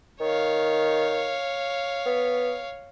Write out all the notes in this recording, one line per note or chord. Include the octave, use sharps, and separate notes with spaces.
D#3 C#5 F5
B3